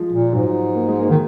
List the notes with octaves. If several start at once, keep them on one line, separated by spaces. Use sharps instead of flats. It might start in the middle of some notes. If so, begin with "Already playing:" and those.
Already playing: F3 G#3
A#2
G#2 F#3
A#3
G#3
A#3
D#3